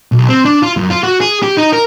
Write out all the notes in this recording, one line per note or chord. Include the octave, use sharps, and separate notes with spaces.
B1
C4
D4
F4
F#2
F4
F#4
G#4
G4
D#4
A#4